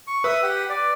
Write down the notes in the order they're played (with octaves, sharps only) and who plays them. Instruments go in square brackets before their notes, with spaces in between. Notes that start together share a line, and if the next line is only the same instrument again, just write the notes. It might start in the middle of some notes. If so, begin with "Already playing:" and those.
[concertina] C#6
[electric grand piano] B4 [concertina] E5 D#6
[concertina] G4 F#5
D5